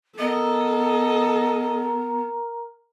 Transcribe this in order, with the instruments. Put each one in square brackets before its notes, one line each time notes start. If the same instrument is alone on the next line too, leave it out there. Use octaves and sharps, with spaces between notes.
[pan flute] B3 [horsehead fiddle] A4 [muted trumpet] A#4 [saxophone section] D#5